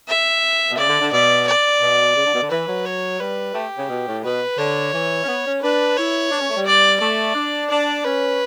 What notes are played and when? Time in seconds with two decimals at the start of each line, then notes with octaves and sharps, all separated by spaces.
0.08 E5
0.71 B2
0.77 C#3 D5
0.89 D3
1.01 D3
1.12 B2 D5
1.47 D5
1.81 B2
2.16 C#3
2.25 D3
2.34 B2
2.42 D3
2.50 E3 B4
2.67 F#3
2.85 C#5
3.19 G3 B4
3.54 A3 G4
3.77 C#3
3.89 B2
4.07 A2
4.24 B2 B4
4.58 D3 C#5
4.93 E3
5.24 C#4
5.28 B3
5.45 C#4
5.62 D4 B4
5.97 E4 C#5
6.31 D4
6.40 C#4
6.49 A3
6.57 G3
6.66 D5
7.00 A3 D5
7.35 D4
7.70 D4 D5
8.04 C#4 B4